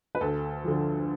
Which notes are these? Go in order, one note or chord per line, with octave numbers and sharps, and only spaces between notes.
B4
D2 A4
D3 F3